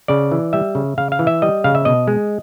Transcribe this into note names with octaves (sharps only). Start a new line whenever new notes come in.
C#3 D5
E3
G3 E5
C#3
C#3 F5
F5
E3
E5
G3 D#5
C#3 F5
E5
B2 D#5
G#3